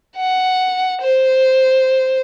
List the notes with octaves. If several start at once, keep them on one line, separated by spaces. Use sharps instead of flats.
F#5
C5